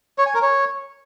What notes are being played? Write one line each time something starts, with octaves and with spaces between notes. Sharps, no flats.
C#5
G#5
A#4
C#5